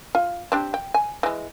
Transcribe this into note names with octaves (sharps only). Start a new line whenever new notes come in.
F4
C4 D4 G4
G5
G#5
E3 G#3